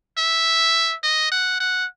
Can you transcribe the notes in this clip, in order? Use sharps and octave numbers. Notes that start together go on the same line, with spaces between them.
E5
D#5
F#5
F#5